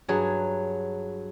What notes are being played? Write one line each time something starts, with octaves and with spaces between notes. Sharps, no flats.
G2 F#3 G#4